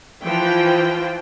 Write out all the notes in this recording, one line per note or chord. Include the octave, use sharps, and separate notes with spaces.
E3 F3 C5 G5